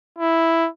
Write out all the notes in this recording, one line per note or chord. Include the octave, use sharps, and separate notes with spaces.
E4